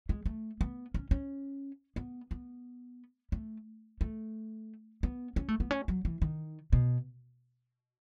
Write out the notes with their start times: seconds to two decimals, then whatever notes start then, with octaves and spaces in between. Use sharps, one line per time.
0.09 G#3
0.26 A3
0.61 B3
0.94 C#4
1.11 C#4
1.96 B3
2.31 B3
3.32 A3
4.01 A3
5.03 B3
5.36 C#4
5.48 A3
5.60 B3
5.71 C#4
5.88 F#3
6.05 E3
6.22 D#3
6.73 B2